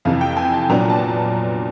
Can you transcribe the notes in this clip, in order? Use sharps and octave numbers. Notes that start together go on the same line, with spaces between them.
F2 C3 E3 F5
G5
G#5
A5
A#2 F#3 B3 D4 A#5
A5